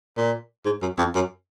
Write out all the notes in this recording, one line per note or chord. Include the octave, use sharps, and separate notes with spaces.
A#2
G#2
F#2
F2
F#2